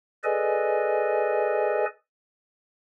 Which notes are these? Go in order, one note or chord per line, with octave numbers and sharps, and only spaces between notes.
G#4 A4 B4 D5 D#5 G#5